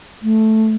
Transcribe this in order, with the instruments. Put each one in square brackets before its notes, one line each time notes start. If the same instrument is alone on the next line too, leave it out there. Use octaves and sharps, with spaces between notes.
[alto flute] A3